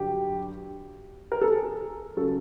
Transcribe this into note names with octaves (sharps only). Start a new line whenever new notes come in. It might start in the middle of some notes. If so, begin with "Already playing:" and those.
Already playing: G2 D3 F#3 G4
A#4
A4
G#4
C#3 F#3 A4